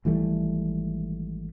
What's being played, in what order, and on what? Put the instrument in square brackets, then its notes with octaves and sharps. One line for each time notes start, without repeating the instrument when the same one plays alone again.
[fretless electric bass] G#1 E3 G3 A3